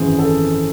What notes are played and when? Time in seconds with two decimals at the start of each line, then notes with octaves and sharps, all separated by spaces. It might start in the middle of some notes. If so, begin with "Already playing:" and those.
Already playing: G#1 F#2 E3 C4 G#4 C5
0.18 A4